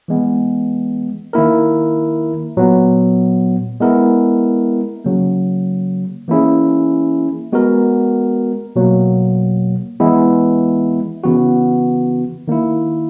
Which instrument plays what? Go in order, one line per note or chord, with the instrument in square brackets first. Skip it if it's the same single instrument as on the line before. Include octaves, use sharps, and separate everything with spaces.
[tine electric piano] E3 G#3 B3
D#3 A#3 E4 A#4
A#2 F#3 B3
G#3 B3 E4 A#4
C#3 F#3 A#3
E3 A#3 C#4 E4 G#4
G#3 B3 F#4 A#4
B2 F#3 A#3
E3 G#3 B3 E4
C#3 E3 B3 F#4
D#3 A#3 E4